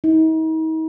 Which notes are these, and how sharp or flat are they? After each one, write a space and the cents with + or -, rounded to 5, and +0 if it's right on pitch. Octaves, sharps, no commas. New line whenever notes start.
D#4 +40